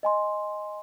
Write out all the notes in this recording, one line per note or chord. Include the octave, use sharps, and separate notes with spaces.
D#5 G#5 C6